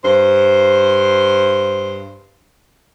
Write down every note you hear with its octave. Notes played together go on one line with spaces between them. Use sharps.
G2 C5